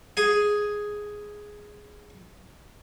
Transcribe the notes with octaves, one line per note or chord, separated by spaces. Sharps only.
G#4 G#5